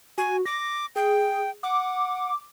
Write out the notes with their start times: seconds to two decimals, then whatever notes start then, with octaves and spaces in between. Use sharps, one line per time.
0.18 F#4 G#5
0.46 D6 A#6
0.96 G#4 G5
1.63 F#5 D6